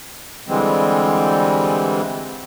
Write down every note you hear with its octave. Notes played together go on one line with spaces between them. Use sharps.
D3 E3 G3 G#3 C4